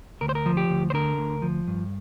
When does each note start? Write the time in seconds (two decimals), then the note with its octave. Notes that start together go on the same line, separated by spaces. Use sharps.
0.21 D2 A#4
0.29 C5
0.35 A#4
0.46 F3
0.57 G4
0.70 D2
0.90 C5
0.94 D3 A#4
1.18 D2
1.42 F3
1.67 G2